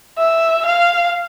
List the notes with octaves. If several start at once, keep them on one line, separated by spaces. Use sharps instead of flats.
E5
F5